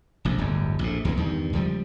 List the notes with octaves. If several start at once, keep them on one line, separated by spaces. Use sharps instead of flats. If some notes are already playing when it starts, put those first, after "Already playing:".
F1 A#1 F2
D1 G1 E2
A#1 A2
C#2 E3 G#3 B3
E2 G2 D#3
C#2 F3 G3